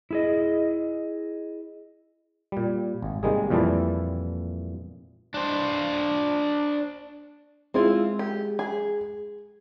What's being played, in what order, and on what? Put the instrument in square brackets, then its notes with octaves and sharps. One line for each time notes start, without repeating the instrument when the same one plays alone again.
[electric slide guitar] E4 G#4 D#5
[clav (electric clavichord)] A#2 G3
G#1
C3 D#3 G3 G#3 A#3 G#4
F2 A#2 E3 G3 E4 A5
[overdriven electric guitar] D4 C5
[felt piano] G#3 [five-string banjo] C4 E4 F4
[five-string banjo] G4
G#4